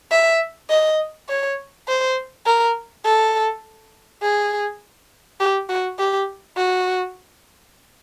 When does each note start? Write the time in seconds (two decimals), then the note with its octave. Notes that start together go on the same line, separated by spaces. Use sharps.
0.11 E5
0.70 D#5
1.29 C#5
1.88 C5
2.46 A#4
3.05 A4
4.22 G#4
5.40 G4
5.70 F#4
5.99 G4
6.57 F#4